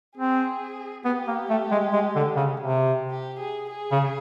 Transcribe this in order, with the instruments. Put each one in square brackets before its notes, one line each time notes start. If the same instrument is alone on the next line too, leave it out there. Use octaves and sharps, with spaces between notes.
[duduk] C4 [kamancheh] G#4
[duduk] B3 [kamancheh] G4
[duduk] A#3
A3
G#3
G#3
D3
C#3
C3
[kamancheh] G4
G#4
G#4
[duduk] C#3